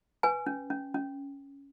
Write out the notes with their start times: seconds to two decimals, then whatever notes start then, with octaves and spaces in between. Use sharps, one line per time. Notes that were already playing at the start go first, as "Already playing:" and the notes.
0.23 B4 G#5
0.47 C#4
0.70 C#4
0.94 C#4